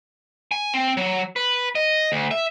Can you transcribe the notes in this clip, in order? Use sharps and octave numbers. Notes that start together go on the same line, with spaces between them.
G#5
C4
F#3
B4
D#5
D2
E5